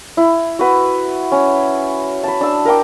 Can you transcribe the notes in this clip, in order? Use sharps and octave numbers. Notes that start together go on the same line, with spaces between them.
E4
F#4 B4
C#4
A5 B5
D4 E6
A#4 G5 D6